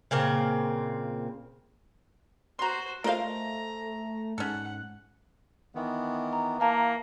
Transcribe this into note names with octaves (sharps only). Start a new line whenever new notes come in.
A#2 C#3 A#3 C4
F#4 C5 A#5 C6
A3 F4 A#4 C5 D#5 F5 A#5
G#2 C#4 A4 F#5
D#3 E3 B3
A#5
E3 A#3 F5 A5 A#5